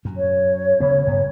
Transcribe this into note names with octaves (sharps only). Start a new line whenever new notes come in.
F#2
C#5
D2 C#3 B3
F#1 G2 B3